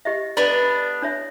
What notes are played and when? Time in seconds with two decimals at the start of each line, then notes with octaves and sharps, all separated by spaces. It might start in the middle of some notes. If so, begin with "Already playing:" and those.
0.05 G4 D#5 E5
0.37 B3 D4 A4 D5 B5
1.02 D4 C#5 E5